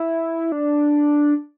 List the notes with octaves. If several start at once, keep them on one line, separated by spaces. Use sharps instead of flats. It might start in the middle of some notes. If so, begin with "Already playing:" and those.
Already playing: E4
D4